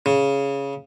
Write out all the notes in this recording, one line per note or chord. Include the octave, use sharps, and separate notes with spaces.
C#3